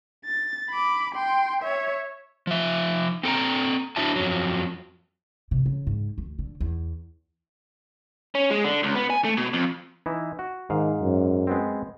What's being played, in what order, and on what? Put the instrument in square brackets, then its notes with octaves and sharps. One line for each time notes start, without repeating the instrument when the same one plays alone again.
[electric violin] A6
B5 D6
G5 C6
C#5 E5
[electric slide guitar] F3 E5
C4 A4 G5 A#5
D4 E4 F#4 E5 A5
F2 F#3
[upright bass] C3
C#3
G#2
D2
D3
E2
[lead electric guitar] C#4
G#3
D3
C#2
B3
G#5
A3
B2
F2
[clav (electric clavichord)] E3 D#4 E4
F#4
[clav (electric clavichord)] G#2 F5 [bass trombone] D#3
[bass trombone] F#2
[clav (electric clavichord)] G#3 B3 C4